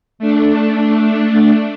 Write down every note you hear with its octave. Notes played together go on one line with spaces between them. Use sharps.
A3 D4